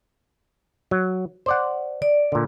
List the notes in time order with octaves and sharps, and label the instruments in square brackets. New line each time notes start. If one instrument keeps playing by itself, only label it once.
[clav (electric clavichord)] F#3
C5 D5 F#5
[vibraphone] D5
[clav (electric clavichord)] A#2 D3